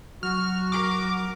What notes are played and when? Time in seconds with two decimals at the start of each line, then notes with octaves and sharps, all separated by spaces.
0.23 F#3 F#4 F6
0.72 A#4 D6